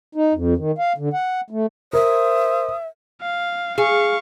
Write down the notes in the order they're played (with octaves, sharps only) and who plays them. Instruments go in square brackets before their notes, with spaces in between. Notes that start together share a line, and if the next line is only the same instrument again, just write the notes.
[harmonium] D#4
F2
D#3
F5
D3
F#5
A3
[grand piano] A#4 [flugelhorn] C5 [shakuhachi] E5 [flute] D#6
[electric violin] F5
[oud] G#4 [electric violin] F5 C#6